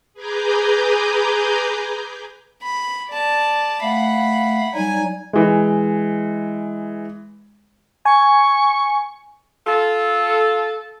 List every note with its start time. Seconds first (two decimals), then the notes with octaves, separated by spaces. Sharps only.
0.14 G#4 B4 G#5 A#5 D6 G6
2.63 B5
3.09 D5 A5
3.82 A3 F5 F#5 B5
4.74 F#3 G3 D#4 G#5
5.33 E3 G#3
8.05 G#5 C#6
9.67 F4 A4